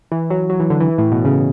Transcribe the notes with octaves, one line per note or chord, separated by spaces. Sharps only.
E3
F#3
F#3
E3
D3
E3
A2
B2
C#3